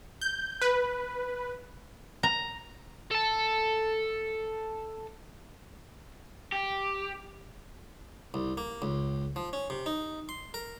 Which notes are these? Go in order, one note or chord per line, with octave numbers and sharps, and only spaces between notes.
G6
B4
A#5
A4 A5
G4
C2
A#3
C#2
F3
C#4
C3
D#4
C6
A#4